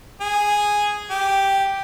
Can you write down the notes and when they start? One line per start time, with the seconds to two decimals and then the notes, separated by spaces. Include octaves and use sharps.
0.21 G#4
1.10 G4